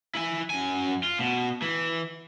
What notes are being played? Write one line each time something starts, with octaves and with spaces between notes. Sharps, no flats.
E4 G#5
F#2 G#5
F4
B2
E3